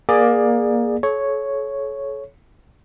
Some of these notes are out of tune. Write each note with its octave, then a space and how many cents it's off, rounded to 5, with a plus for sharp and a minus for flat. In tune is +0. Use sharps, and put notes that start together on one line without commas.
A#3 +20 G#4 +0 D5 +15
A4 -40 C#5 +0